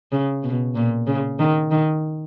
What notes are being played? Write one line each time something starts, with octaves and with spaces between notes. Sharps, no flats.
C#3
B2
A#2
C#3
D#3
D#3